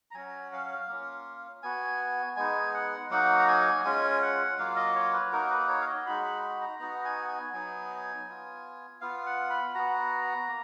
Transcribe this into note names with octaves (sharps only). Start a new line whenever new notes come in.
A#5
F#3 C#4 F#4 G#5
F5
A#3 C#4 F4
B3 F#4 G#5
G#3 B3 D#4 G#5
F#5
F#3 A#3 D#4 F#4 F#5
A#5
G#5
G#3 C#4 F4 G#5
F#5
F#3 A#3 F4 F5
D#5
C#5
B4
A#3 D#4 F#4 A#4
B4
C#5
F5
D#5
G#3 D#4 F#4 B5
B5
B5
A#5
B3 D#4 F#4 A#5
G#5
G#5
F#3 B3 D#4 G#5
B3 F4
B3 F4 F5
F#5
B5
B3 F#4 A#5
A#3